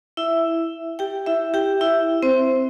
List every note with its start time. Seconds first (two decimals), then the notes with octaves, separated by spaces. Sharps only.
0.17 E4 E5
0.99 G4 G5
1.26 E4 E5
1.54 G4 G5
1.81 E4 E5
2.23 C4 C5